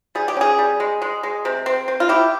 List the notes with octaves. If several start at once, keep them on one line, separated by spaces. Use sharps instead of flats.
G3 G#4
G4
C#4 G#4
G3
G#3
G#3
G#3
C3
C4
C4
F4
E4 G4